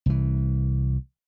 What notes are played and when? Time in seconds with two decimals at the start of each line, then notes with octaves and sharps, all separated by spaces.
0.06 C2 E3